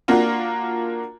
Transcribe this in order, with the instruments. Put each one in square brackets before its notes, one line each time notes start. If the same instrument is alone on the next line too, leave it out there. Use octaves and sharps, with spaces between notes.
[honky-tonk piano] A#3 D4 F4 F#4